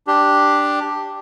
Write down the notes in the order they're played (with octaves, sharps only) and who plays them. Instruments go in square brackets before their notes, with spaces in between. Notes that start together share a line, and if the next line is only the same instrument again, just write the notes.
[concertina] D4 G4